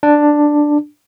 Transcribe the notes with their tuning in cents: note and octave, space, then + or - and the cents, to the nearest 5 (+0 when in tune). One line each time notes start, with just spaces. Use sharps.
D4 +5